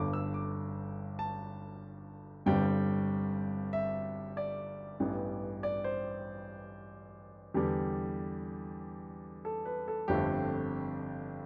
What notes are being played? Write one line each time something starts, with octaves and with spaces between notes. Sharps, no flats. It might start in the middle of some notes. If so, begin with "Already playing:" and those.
Already playing: G1 G2 D3 D6
E6
D6
A5
G1 G2 D3 G3 C4 G5
E5
D5
A1 G2 E3 G3 B3
D5
C5
E2 D3 G3 G4
A4
B4
A4
G1 F2 D3 A3 C4 G4